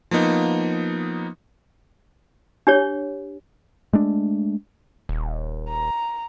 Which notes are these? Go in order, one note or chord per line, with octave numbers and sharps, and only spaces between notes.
F3 A#3 B3 D#4
D4 G4 C#5
G#3 A3 D4
D#1
A#5